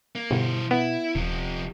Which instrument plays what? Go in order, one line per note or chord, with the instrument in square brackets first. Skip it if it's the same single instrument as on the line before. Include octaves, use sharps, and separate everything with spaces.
[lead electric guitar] A#3
[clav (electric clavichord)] G1 [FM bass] B2 [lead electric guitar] E3 C5
[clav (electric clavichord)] B3 [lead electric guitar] E4
[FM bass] D#1 [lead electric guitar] C3 F3